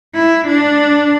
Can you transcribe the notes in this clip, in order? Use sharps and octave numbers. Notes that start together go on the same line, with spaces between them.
E4
D4